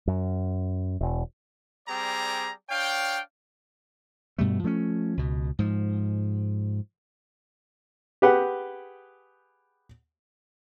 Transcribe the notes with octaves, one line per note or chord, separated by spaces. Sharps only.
F#2
E1
G3 C4 G#4 D5 A#5
D4 C#5 F5 G5
G2 B2 G3 A3
F3 A3 C4 C#4
C#2 B2
G#2 F3
G4 G#4 B4 F#5 G5